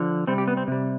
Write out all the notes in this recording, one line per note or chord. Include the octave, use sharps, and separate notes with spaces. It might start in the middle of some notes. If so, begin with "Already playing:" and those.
Already playing: D3 F3
C3 G3 C4
G4
B3
C4
C3 G3